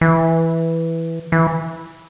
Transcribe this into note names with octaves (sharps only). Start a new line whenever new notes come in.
E3
E3